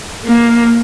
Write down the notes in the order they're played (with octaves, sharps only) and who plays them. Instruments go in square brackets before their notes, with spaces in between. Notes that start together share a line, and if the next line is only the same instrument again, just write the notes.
[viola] A#3